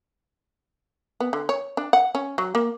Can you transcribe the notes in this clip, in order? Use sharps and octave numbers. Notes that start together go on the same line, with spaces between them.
B3
D3
C#5
D4
F#5
C#4
F#3
A#3